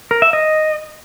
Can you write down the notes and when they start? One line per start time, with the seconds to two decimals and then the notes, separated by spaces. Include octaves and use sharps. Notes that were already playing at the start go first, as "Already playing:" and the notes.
0.11 A#4
0.22 E5
0.33 D#5